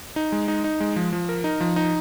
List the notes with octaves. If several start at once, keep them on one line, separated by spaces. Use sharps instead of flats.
D#4
G#3
D#4
D#4
G#3
F3
F3
A#4
D#4
F3
D#4